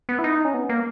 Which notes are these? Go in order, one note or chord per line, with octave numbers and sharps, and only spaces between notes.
B3
E4
D#4
C#4
B3
A#3